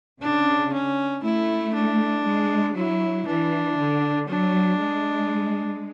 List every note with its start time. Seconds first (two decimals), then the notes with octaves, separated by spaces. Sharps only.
0.21 C#3 D4
0.73 C#4
1.23 A3 E4
1.74 D4
2.26 G#3
2.76 F#3 E4
3.27 E3 D4
3.78 D3
4.28 F#3 D4
4.80 G#3